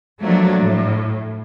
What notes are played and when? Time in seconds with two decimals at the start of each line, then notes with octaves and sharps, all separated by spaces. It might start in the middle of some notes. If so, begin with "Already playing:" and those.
0.20 F3 F#3 A3 A#3 D4
0.58 A2